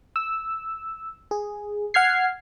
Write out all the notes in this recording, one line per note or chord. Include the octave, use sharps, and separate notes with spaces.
E6
G#4
F#5 F6 G#6 C7